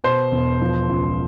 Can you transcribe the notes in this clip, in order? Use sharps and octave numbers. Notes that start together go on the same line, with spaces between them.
B2 C5
E1
F3
C#2